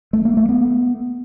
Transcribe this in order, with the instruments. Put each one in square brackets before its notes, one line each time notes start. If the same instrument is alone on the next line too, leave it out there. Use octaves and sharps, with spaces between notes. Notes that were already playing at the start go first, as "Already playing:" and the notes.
[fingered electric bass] A3
A#3
A3
B3